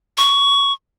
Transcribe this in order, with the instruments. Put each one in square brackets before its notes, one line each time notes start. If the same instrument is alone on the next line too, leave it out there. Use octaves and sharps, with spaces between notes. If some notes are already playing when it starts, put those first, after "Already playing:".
[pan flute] C#6